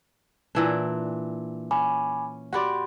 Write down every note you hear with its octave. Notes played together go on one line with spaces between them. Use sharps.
A#2 E3 D4
C#4 G#5 B5 D6
F#4 G4 D5 F#5 B5 C6